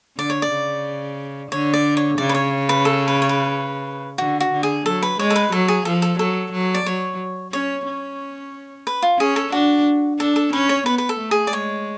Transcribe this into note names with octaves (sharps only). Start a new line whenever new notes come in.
D3 D5
C#5
D5
C#3
D3 C#5
D5
C#5
C#3 D5
B4
C#5
B4
A4
B4
C#5
B4
D3 F#4
F#4
D3
G#4
F#3 A4
B4
G#3 C#5
A4
B4
F#3 A4
G#4
F3 A4
A4
F#3 A4
F#3
D5
F#3 C#5
C#4 C#5
C#4
B4
F4
C#4 G#4
A4
D4 F#4
D4 A4
A4
C#4 B4
C#5
B3 B4
B4
A4
A3
G#4
D5
G#3 C#5